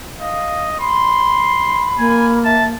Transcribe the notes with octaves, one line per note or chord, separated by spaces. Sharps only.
D#5 F5
B5 C6
A#3 G#5
E5 A5